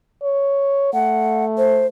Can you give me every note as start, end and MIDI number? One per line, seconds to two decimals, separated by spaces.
0.23 0.93 73
0.93 1.88 57
0.93 1.45 78
1.58 1.87 72